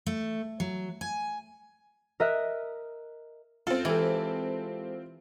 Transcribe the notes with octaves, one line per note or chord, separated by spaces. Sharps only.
A3
F#3
G#5
A#4 D#5 E5 F#6
C4 F4 A4
E3 G#3 G4 A4